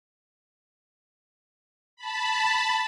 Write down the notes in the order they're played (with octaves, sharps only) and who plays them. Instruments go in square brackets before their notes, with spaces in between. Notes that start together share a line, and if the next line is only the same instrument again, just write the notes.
[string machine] A5 B5